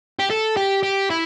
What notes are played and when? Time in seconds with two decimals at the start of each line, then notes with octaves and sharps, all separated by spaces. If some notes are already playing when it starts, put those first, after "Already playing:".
0.19 G4
0.30 A4
0.57 G4
0.83 G4
1.10 E4